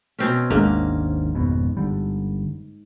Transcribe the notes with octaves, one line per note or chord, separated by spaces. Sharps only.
B2 C4 C#4
G#1 D#2 G#2 A#3 D4
G#1 F2 B2
G1 D3 G3